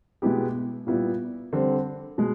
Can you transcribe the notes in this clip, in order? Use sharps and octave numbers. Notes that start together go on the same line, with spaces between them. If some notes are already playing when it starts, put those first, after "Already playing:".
B2 G#3 B3 E4 G4
A#2 G3 B3 E4
D3 G3 C4
B2 G#3